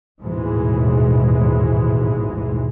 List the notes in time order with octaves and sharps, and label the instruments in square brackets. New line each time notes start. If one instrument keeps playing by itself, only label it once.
[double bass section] A1 D#2 G#2 B2 E3 G#3